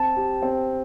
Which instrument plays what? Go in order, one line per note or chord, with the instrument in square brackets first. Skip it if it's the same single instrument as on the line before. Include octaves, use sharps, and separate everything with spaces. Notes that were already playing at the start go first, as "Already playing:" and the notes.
Already playing: [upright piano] C4 [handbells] A5
[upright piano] G4
C4